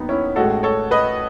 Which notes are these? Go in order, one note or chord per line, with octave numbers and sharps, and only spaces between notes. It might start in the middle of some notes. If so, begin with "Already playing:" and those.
Already playing: D#2 D#3 F#3 B3 D#4
C#4 E4
A1 A2 G#3 F#4 A4
A4 C#5
B4 D#5